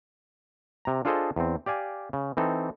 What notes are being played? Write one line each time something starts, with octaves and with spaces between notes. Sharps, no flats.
C3 A#5
D4 F4 G#4 A4 C5 D#5
E2 C4
G4 D5 F5 G#5
C#3
E3 C4 D#4 A4